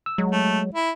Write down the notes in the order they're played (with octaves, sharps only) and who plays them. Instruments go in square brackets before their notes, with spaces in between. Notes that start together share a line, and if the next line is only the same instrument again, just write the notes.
[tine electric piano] E6
[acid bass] F#3 [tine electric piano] G#3
[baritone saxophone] A3
E4